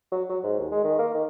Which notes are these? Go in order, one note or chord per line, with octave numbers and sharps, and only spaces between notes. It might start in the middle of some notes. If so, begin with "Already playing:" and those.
F#3
F#3
G#2
D#2
G#3
D#3
A#3
D#3